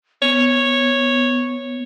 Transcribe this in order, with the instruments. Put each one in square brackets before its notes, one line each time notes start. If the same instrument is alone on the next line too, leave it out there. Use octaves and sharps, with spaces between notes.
[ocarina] B3 [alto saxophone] C#5